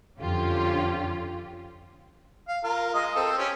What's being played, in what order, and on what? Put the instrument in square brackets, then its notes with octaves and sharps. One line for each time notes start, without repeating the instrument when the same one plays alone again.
[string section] F2 D3 C#4 F4 G4
[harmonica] F5
F4 A#4
G#3 D#5 D#6
C4 A4
C#4 G4